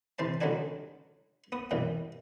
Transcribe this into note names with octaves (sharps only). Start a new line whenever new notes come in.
C3 E3 C5 A5
C#2 D3 F#3 G3 D4 G#5
B3 D#6
F#2 B2 E3 G3